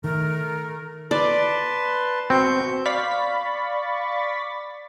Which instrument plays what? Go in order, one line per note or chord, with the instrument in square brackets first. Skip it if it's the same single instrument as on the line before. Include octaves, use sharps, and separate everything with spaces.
[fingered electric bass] D#3 [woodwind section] A3 A#4
[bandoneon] B4 A5 C6 [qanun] D5
[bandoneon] B2 C#6 G6 [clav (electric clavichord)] C4
[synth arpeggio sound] D5 F5 B5 C#6 A6 B6